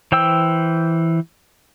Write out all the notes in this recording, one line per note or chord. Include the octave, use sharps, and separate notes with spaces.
E3 C5 G5 E6